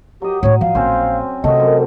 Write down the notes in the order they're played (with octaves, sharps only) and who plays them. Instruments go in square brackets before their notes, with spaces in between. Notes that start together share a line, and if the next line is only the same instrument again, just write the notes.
[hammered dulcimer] F#3 D#5 [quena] G4
[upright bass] A2 D4 [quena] C#5
[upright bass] F3 [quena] F5
[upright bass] A#1 [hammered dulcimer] C4 C#4 C5
[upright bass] C3 [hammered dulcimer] A3 F#4 [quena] D#5
[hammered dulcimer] F#2